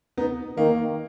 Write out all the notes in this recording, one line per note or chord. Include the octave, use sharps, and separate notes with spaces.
B3 D#4
D#3 A#3